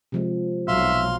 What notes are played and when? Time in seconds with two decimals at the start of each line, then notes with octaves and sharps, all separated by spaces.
0.12 C3 F3 G#3
0.68 B1 F#3 E5 F5 C6